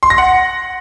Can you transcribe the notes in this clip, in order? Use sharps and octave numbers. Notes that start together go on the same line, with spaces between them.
C6
A#6
F#5